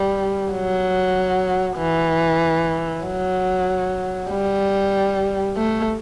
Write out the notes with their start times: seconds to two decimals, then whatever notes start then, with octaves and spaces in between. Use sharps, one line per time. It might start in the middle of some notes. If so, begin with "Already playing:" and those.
Already playing: G3
0.52 F#3
1.78 E3
3.04 F#3
4.30 G3
5.57 A3